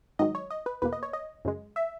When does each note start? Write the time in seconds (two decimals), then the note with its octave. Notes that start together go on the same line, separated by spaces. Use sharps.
0.19 G#2 D#3 F#3 D#5
0.35 C#5
0.50 D#5
0.66 B4
0.82 E2 B2 A#3 B4
0.93 D#5
1.03 C#5
1.13 D#5
1.45 F#2 C#3 G#3
1.76 E5